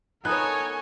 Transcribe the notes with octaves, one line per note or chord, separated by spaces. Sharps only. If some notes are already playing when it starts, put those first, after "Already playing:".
B3 D#4 A4 A#4 C#5 G#5 F#6